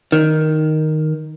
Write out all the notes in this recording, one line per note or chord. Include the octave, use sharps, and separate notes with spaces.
D#3